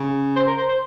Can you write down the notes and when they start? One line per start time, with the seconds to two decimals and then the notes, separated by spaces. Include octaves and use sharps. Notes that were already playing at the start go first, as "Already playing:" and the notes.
Already playing: C#3
0.36 C5
0.47 A#4
0.58 C5
0.69 C5